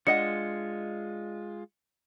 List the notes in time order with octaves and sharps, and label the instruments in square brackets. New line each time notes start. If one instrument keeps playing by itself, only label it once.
[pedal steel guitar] G#3 F4 [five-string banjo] D4 D#5 F#5 [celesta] C#7